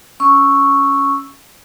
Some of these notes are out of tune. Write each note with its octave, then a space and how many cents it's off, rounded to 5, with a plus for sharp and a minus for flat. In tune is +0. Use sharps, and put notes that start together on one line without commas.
C#4 +0 C#6 +0 E6 +0